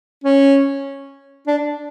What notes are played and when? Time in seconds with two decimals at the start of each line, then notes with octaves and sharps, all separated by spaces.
0.24 C#4
1.47 D4